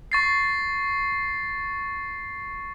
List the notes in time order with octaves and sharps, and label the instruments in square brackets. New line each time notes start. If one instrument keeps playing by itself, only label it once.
[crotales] C#6 A6 C7